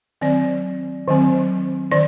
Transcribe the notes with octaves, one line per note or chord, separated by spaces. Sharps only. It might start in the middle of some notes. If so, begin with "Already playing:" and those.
D#3 F#3 C4 D5
D#3 F#3 C4
D#3 D5